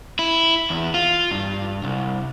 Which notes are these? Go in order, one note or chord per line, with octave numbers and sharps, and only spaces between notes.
E4
E2
F4
G2
C2